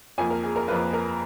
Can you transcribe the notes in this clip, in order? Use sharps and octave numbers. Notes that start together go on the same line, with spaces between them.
F2 F3 A#3 G#5
A#4
G#4
A#4
F2 F3 A#3 B4
A#4